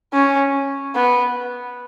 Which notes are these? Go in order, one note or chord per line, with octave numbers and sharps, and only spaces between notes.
C#4
B3